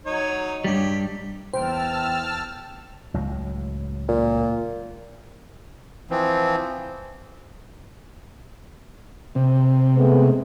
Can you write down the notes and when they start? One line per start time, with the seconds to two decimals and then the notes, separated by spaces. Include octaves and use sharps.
0.06 F#3 D#4 C#5
0.64 G2 G3 G4
1.54 E2 C5 G5 A5 E6 F6
3.14 C#2 A2 F#3
4.08 A#2
6.11 E3 F3 C4
9.35 C3
9.97 G#3 A3 B3